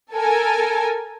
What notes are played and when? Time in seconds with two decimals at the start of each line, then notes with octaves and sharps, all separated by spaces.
0.13 A4 A#4 G#5